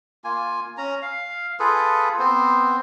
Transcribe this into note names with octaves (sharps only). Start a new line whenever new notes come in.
A#3 F4 G#5
C#4 A#5
F5
F4 G#4 A4 B4
B3 C4 C5